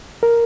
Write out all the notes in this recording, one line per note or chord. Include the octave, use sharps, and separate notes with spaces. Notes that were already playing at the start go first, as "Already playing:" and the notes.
A#4